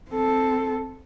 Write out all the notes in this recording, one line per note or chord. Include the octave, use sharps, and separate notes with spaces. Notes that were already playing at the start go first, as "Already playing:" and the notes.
C4 A4